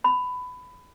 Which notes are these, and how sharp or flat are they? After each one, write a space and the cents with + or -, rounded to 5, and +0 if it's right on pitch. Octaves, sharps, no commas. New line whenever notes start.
B5 +15